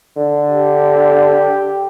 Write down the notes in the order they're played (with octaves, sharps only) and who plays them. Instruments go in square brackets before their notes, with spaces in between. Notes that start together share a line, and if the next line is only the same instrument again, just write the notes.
[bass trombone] D3
[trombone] G4